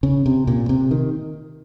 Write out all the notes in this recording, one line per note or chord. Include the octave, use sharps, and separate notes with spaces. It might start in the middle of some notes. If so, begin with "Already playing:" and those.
C#3
C3
A#2
C3
D#3